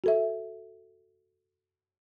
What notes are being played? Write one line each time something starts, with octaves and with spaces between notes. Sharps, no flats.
F#4 A4 E5